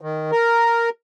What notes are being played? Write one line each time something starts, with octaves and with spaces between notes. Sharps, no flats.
D#3
A#4